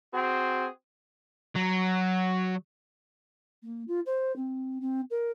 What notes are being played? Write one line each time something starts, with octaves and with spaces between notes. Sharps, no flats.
C4 F#4 G#4
F#3
A#3
F4
C5
C4
C4
A#4